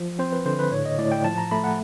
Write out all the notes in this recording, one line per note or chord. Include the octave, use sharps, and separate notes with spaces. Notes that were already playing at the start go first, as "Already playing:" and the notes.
Already playing: F3
C4 C5
B4
D3 C5
B4
A2 C#5
D#5
A2 D5
G5
F3 A5
A#5
A3 B5
F#5